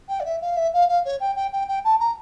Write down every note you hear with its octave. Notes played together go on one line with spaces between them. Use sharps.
G5
D5
E5
F5
E5
F5
F5
C#5
G5
G5
G5
G5
A5
A#5